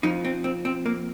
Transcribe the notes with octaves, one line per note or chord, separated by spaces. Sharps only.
F2 F3 D#4
C4
C4
C4
A#3